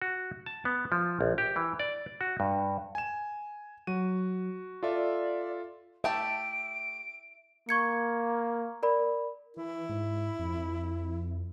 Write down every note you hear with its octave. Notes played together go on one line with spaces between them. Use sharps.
F#4
A5
B3
F3
A#1
G4
E3
D5
F#4
G2
G#5 E7
F#3 F#4 D#7
F4 A4 D5 E5
A3 G4 E5 A5 D7
A#3 C#6 G#6 C#7
A#4 D5 B5
E3 E4
G#2
F2